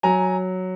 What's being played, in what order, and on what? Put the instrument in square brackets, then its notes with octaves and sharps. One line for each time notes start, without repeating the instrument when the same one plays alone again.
[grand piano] F#3 G#5 A#5